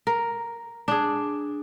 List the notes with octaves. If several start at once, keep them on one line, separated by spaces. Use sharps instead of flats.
A#4
D4 G#4